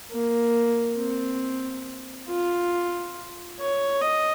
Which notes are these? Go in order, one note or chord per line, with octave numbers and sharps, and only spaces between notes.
A#3
C4
F4
C#5
D#5